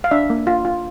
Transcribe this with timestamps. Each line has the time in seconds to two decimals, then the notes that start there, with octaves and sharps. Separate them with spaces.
0.04 F5
0.11 D4 E5
0.30 A#3
0.47 F4
0.65 F4